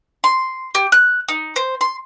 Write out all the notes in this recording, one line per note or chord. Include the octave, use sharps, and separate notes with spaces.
C6
G4
F#6
D#4
C5
C6